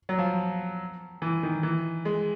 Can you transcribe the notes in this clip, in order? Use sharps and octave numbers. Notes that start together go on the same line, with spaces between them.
F#3
F3
E3
D#3
E3
G#3